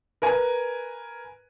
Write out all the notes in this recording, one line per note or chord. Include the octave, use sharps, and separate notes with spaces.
A#4 B4 G#5